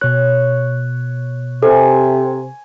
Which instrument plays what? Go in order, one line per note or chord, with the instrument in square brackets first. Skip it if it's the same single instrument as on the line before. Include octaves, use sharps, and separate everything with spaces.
[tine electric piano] B2 F#6 [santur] C#5
[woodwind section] C3 [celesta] A4 [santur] G#5